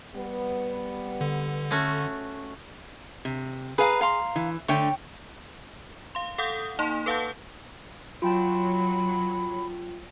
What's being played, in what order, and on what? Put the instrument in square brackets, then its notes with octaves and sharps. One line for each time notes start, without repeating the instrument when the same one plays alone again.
[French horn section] G3 B3
[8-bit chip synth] D3
[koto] A3 C#4 F#4
[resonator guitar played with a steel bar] C3
[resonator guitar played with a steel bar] G#4 [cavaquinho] B4 F5 A#5
[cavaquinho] F5 A#5 C6
[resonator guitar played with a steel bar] E3
[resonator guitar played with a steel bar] D3 A3 [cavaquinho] C#5 G5
[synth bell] F5 C6
A4 F5 F#5 D#6 G6
A#3 D#4 A5 C6
A4 B4 F5 F#5 A5 G6
[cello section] F#3 [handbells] F4 G5 A5 [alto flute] B5